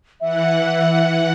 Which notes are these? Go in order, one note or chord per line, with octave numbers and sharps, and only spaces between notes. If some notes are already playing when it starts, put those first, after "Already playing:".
E3 E5 F#5